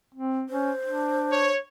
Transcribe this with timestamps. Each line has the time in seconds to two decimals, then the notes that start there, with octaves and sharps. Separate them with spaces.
0.14 C4
0.50 C#4 C5
0.86 D4
1.30 C#5